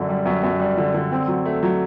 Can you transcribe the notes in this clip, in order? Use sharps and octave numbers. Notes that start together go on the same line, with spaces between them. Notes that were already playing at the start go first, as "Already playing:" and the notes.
Already playing: F#2 D3
G3
F#2
F#2
G3
D3
D3
C4
F#3
A3
F#3